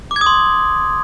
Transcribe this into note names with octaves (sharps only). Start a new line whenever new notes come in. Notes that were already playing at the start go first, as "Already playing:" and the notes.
D6
G#6
D#6
C6